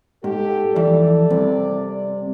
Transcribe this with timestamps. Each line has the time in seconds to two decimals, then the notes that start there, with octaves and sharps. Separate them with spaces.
0.24 G#2 G4 A4
0.76 F2 E3 D5
1.30 C2 C3